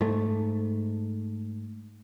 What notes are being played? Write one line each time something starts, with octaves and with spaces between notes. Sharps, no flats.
G#2 A3